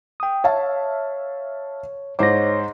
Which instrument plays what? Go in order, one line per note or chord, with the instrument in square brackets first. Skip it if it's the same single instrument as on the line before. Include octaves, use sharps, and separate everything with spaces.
[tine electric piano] G5 D#6
[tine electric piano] C#5 [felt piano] E5 F5 A5
[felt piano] G#2 C5 D6 [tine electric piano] C#5 A#6